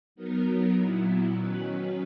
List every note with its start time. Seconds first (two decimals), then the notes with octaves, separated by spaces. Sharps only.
0.15 F#3 B3 D#4 A#4
0.75 A#2 F#3 B3 E4
1.34 D#3 F#3 C#4 F#4 B4